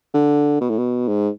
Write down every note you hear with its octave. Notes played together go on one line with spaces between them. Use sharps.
D3
B2
A2
B2
G#2